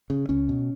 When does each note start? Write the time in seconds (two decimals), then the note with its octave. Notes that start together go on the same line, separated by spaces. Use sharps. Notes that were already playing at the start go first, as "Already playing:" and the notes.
0.10 C#3
0.29 C#2 C#4
0.49 B2